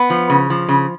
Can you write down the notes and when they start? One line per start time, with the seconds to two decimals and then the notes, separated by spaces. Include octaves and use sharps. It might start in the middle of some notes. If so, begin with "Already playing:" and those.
Already playing: B3
0.10 F3
0.30 C#3
0.50 F3
0.68 C#3